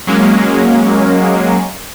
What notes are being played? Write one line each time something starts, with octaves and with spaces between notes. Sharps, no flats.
F#3 G#3 A#3 C#4